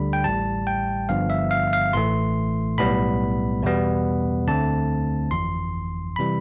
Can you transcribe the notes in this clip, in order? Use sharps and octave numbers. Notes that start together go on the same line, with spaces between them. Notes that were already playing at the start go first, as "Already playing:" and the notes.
Already playing: D2 D3 G3 B5
G5
A1 A2 G3 A5
G5
G1 G2 D3 F3 B3 F5
E5
F5
F5
A1 A2 E3 A3 C6
B1 A2 G3 B3 B5
E2 B2 G3 B3
D2 D3 A3 C4 A5
G1 F2 E3 C6
C3 E3 G3 B5